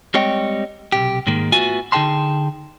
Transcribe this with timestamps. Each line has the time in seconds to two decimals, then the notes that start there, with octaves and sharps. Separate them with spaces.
0.14 G3 G#3 C4 C#5 D#5 G5
0.92 B1 C3 G4
1.27 G#2 D#3 G#3 A#3
1.52 A3 B3 F4 F#4 E5 G#5
1.92 D3 D#4 G#4 G5 A5 C6